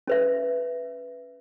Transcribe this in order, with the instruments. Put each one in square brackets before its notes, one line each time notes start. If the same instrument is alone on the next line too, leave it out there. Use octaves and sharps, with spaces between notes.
[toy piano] C#4 B4 E5